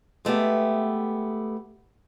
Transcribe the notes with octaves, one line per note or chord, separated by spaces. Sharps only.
G#3 A3 B3 G4